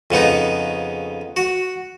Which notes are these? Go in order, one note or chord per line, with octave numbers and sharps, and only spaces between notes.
F2 C#3 B3 D#4
F#4